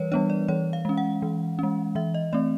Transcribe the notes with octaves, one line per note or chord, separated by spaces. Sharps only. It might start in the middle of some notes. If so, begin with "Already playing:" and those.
Already playing: E3 G3 A#4 B4 C#5
G3 B3 D4 C#5
D5
E3 C#5
F5
G#3 C#4
F#5
E3
G#3 C#4
E3 E5
D#5
A3 C4 D5